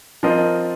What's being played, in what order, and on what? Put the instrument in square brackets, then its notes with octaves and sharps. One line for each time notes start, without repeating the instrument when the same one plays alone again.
[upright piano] F3 C4 F4 A#4 D#5